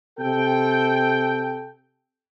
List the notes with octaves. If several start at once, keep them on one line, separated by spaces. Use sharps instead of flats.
C3 A4 G5